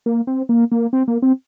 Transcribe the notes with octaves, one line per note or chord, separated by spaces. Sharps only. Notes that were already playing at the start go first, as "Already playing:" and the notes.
A#3
C4
A#3
A#3
C4
A#3
C4